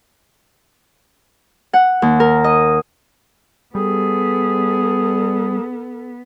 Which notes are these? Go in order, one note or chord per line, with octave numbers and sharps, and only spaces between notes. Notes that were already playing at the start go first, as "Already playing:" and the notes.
F#5
D#2
A#4
D#5
G3 B3 G#4 A4